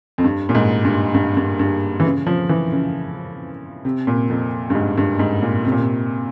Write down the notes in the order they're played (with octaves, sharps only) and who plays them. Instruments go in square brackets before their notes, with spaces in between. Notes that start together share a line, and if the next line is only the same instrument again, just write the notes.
[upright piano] F2
G2
A#2
G#2
G2
G2
G2
G2
E3
C#3
F3
E3
C#3
C3
A#2
F2
G2
G#2
G2
G#2
A#2
C3
A#2
C3